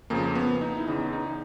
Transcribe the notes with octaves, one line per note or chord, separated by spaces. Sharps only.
F2 C#3 F3 A#3
B3
D#4
E4
E2 C#3 E3 D#4
D#4